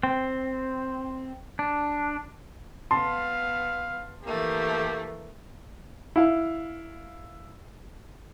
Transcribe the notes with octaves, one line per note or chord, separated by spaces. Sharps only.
C4
D4
B3 F5 A5 C6
E3 A3 A#3 G4
E4 F5